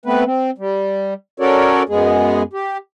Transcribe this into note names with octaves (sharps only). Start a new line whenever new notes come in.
A3 B3 C4 B4
C4
G3
C#4 F#4 A4 A#4 C#5 D5
F#2 G#3 B3 G#4
G4